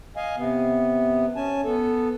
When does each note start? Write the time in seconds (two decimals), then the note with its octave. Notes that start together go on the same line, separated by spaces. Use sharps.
0.17 D#5 F5 G#5
0.37 C3 B3
1.36 C#4 G#5 A5
1.65 B3 A4